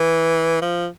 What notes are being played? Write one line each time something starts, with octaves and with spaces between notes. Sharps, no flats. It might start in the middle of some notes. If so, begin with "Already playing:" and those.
Already playing: E3
F3